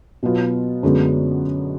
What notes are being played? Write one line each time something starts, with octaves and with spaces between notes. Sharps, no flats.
B2 F#3 B3 F4
F#2 D3 G#3 B3 F#4